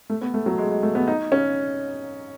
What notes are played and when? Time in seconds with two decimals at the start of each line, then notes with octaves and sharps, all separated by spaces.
0.10 A3
0.21 B3
0.34 A3
0.46 F#3
0.58 G#3
0.71 G#3
0.83 A3
0.95 B3
1.08 D#4
1.32 C#4